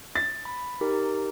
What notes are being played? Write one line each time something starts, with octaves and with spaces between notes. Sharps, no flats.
A6
B5
D#4 G4 A#4